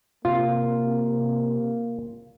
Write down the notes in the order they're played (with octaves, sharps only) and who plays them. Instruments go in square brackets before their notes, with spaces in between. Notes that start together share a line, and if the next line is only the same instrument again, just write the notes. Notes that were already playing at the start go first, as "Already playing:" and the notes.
[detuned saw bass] C3 [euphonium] A#3 [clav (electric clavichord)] F4